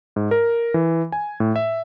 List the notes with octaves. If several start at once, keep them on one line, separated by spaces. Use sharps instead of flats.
G#2
A#4
E3
G#5
A2
E5